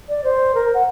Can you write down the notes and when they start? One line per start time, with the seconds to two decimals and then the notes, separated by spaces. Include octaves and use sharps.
0.09 D5
0.24 C5
0.55 A#4
0.74 F#5